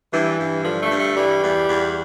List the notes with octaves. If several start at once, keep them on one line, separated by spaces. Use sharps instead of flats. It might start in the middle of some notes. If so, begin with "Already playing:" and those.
G2 E3
G2
D3 F3
A3
G2
A3
E3 G3
E2
E2